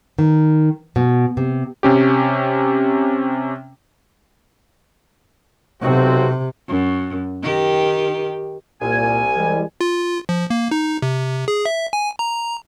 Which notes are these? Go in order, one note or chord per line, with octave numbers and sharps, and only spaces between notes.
D#3
B2
C3
C3 C#4 G4
B1 C3 C4 F#4
F#2
D#3 G4
C2 A#2 G#5
E3 G3 G#3
F4
F3
A#3
D#4
C3
G#4
E5
G#5
A#5